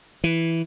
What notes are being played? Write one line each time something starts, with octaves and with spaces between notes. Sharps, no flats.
E3